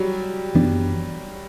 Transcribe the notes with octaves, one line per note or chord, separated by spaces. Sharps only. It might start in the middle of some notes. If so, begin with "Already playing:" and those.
Already playing: F#3 G3
F#2 E3 B3 D4